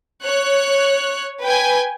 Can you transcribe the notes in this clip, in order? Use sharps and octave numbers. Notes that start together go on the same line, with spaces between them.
C#5 F#6
B4 G5 G#5